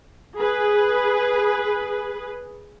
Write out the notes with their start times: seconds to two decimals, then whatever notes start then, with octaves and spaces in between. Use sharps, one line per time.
0.39 G#4 B4